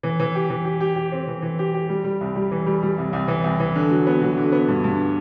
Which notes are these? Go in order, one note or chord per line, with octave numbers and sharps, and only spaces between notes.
E3
E3
G4
E3
G4
G4
G4
C4
E3
E3
G4
G4
G3
G3
C2
G3
E3
G3
G3
C2
C2
E3
C2
E3
D3
F#3
B3
F#3
D3
B3
G2
G2